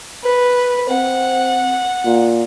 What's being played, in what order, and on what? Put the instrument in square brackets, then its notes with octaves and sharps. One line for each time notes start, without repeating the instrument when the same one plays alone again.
[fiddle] B4
[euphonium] C4 [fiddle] F#5
[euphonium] A#2